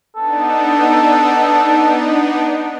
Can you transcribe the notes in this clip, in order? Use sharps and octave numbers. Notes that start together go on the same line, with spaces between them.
B3 D4 D#4 A4